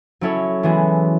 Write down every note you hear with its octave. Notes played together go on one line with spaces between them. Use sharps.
F#3 C#4 E4 A4 C#5
E3 G#3 B3 F#4